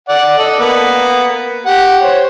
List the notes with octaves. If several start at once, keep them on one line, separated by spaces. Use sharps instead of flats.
D5 F#5
A4 D5 D#5
A#3 B3
G4 F#5
C5 C#5